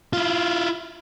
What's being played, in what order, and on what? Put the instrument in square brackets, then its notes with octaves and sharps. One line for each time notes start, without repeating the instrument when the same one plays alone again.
[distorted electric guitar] E4 F4